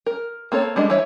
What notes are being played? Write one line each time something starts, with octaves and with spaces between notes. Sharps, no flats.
A#4
A#3 C4 A4 C#5
G3 G#3 D4 B4 D#5
E3 C#5 E5